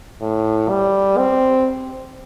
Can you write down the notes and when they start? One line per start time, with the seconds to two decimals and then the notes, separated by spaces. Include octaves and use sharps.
0.21 A2
0.69 G3
1.18 C4